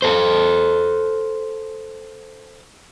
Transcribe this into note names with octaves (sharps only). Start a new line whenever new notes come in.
A4 C5